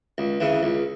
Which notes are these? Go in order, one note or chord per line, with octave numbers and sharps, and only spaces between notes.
C#2
C#3 E3
C#2